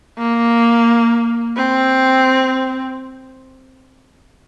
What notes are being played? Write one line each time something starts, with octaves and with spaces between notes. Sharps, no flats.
A#3
C4